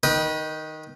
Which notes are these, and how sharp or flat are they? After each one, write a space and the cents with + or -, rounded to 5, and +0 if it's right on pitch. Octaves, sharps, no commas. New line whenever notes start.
D#3 +0 D#4 +0 B4 -30